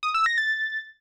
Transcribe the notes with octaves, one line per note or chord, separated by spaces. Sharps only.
D#6
E6
A#6
A6